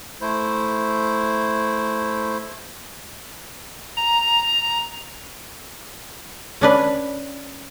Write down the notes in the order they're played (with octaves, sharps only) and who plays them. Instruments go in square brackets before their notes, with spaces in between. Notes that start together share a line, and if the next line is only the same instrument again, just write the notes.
[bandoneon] A3 E4 C5
[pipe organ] A#5
[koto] C#4 D4 B4